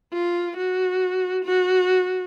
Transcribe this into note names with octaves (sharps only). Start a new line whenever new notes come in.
F4
F#4
F#4